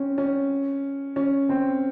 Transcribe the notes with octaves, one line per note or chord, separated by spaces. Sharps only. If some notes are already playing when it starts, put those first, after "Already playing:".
Already playing: C4 C#4
C#4
C#4
C4